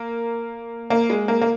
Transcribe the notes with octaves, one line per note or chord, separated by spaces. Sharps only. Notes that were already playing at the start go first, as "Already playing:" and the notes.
Already playing: A#3
A#3
G#3
A#3
A#3